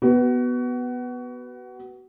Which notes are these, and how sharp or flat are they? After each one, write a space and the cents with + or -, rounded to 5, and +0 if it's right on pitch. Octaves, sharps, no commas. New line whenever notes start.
B3 +0 F#4 +25 B4 +0